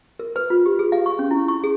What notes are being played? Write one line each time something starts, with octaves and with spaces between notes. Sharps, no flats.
A#4
B4
F4
G4
G#4
F5
C#6
C#4
E4
C#6
G#4